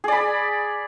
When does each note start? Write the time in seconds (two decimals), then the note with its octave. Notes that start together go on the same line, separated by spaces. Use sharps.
0.04 G#4
0.08 D5
0.12 B5